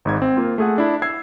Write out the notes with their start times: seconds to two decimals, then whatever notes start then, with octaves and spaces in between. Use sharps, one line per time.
0.05 G#1 G#2 G#6
0.22 C4
0.37 A#3 F4
0.58 A3 G#4 F#5
0.78 D4 E4
1.02 E6 G#6 C7